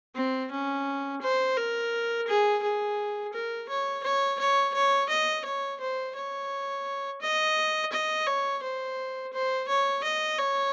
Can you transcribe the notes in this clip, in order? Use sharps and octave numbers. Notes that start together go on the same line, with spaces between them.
C4
C#4
C5
A#4
G#4
G#4
A#4
C#5
C#5
C#5
C#5
D#5
C#5
C5
C#5
D#5
D#5
C#5
C5
C5
C#5
D#5
C#5